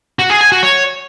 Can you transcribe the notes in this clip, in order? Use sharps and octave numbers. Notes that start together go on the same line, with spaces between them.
F#4
G#4
G#5
F#4
C#5